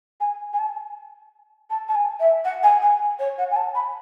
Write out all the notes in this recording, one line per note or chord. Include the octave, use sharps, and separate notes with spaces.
G#5
G#5
A5
A5
A5
G#5
E5
F#5
G#5
G#5
C#5
F#5
G#5
A5
B5